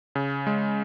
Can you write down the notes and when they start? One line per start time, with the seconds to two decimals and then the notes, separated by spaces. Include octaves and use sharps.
0.15 C#3
0.47 G#3